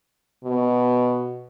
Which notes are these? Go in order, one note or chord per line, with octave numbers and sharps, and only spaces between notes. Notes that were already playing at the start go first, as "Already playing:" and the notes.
B2